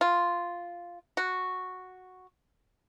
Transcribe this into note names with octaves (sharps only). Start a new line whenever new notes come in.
F4
F#4